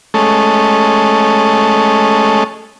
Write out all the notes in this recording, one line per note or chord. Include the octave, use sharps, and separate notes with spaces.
G#3 A3 C#4 A4 D#5